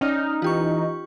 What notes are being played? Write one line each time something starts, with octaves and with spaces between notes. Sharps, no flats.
C#4 D#4 D5 F6
E3 F4 G4 C#6